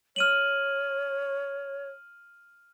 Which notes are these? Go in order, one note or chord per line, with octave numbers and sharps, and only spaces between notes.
C#5 F6 D#7 F#7